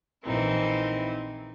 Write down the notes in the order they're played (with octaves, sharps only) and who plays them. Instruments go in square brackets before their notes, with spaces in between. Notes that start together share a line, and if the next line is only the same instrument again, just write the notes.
[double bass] A#1 E3 [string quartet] C4 D#4 E4